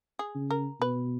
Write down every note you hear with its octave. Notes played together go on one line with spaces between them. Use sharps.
G#4
C#3
A#4
B2 B4